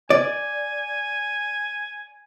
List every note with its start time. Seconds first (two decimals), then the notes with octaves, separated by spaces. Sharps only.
0.10 D5 G#5